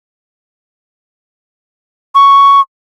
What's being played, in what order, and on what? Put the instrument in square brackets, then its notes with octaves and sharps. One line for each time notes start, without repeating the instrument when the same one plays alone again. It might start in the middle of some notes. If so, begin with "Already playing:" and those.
[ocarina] C#6